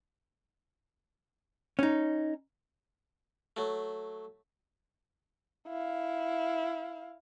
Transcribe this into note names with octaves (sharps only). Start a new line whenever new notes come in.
C#4 D#4
F#3 A3
E4 F5